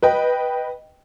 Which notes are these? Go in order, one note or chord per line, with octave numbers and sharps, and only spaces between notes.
B4 D#5 G5